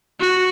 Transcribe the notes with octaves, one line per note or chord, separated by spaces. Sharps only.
F#4